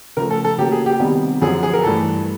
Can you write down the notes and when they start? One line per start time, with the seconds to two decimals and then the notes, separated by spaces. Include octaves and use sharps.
0.17 C#3 F3 A3 A#4
0.31 A4
0.45 A4
0.58 C#3 F#3 A#3 G4
0.72 G#4
0.86 G4
1.00 C3 D#3 G3 B3
1.42 F#2 D3 F3 G#4
1.63 G#4
1.73 A#4
1.83 G2 E3 A3 A4